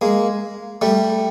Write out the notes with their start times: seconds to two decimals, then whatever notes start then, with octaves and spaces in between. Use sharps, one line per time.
0.01 G#3 A#3
0.82 G3 A3